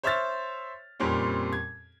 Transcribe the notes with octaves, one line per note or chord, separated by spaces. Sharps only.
C5 C#5 E5 E6 F6 A6
F2 A#2 G3 C4 C#4
G#6